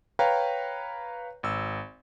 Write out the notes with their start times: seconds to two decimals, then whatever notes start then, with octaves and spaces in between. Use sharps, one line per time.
0.19 B4 C#5 F5 G5 A#5
1.43 G#1 E6